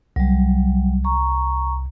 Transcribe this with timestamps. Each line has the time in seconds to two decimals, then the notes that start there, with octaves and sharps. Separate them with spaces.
0.16 C2 F#3 G3
1.05 A#5 C#6